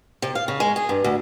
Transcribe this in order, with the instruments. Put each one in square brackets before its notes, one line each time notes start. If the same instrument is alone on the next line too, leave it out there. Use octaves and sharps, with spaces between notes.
[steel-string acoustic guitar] C3
F5
C#3
G#3
G#4
G2
D2